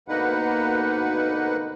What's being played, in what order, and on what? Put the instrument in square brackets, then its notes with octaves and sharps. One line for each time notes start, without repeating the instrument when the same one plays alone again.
[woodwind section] D2 B2 D#4 [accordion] A#3 B4 F#5